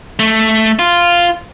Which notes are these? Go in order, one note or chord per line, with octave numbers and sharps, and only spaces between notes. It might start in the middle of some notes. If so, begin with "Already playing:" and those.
A3
F4